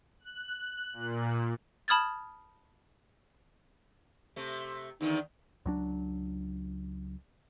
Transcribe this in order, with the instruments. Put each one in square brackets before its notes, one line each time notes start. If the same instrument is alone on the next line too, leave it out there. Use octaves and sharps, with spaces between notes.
[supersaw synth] F#6
A#2
[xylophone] A5 B5 D#6 F6 G#6 A6
[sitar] C3 A3
[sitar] E2 D3 D#3 [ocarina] D#4
[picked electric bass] C#2 F#3 D4